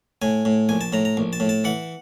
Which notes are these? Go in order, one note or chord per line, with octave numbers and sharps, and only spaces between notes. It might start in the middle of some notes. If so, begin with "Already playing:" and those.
A2 G#5
A2
A#1 G#5
A5
A2 A#5
A#5
A#1
A5
A2
A5
E3 F#5